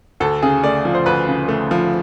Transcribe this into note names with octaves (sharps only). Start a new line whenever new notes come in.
D2 A4
C#3 G#4
A3 D5
F3
C5
D2 B4
C#3
A3
F3